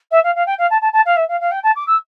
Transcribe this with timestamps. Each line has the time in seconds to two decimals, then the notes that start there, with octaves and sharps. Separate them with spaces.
0.11 E5
0.24 F5
0.35 F5
0.46 G5
0.58 F5
0.70 A5
0.81 A5
0.93 A5
1.05 F5
1.16 E5
1.28 F5
1.40 F5
1.51 G5
1.63 A5
1.76 D6
1.87 E6